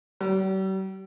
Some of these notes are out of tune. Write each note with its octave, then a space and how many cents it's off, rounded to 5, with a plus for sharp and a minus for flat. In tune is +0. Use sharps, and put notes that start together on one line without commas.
G3 -45